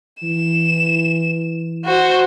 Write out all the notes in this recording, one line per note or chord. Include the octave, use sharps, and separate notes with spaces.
E3 E7
F#4 C5